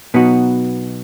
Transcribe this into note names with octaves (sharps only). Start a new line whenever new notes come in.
B2 F#3 B3 D#4 F#4